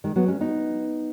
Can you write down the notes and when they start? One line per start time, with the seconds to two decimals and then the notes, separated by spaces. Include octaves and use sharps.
0.04 D#3 G#3
0.16 F#3 B3
0.28 G#3 C#4
0.41 B3 D#4